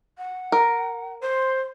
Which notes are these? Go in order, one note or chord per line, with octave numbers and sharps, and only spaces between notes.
F#5
A#4
C5 C6